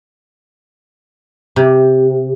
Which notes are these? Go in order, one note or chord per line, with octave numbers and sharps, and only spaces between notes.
C3